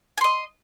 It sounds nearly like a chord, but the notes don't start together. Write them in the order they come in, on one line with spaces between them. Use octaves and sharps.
G#5 C6 D#5